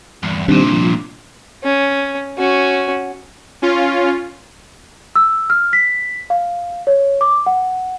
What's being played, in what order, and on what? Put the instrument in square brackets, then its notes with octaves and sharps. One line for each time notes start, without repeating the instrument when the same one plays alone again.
[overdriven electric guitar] E2 G2
[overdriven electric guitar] C2 A#2 [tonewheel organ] D#3 G3 C4 [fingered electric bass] D4
[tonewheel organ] F3
[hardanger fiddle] C#4
C#4 F#4
[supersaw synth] C#4 F4
[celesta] E6
F6
B6
F5
C#5
D6
F#5